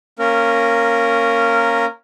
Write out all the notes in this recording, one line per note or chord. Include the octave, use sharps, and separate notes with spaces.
A#3 C#4 A#4